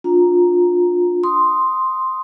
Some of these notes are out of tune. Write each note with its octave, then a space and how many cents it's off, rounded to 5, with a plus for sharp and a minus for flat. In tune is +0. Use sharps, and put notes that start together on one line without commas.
D4 +0 F4 +25 A#5 +0
C6 +0 D#6 +0